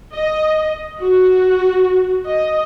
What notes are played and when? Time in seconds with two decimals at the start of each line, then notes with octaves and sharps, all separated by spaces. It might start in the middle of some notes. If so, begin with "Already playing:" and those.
0.13 D#5
1.00 F#4
2.28 D#5